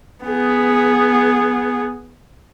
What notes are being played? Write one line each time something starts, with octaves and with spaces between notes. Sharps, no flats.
B3 G#4